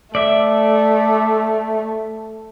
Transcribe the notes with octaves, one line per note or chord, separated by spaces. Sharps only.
A3 D5 E5